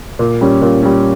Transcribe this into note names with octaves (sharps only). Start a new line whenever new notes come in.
A#2
G3 C#4
A#2
G3 C#4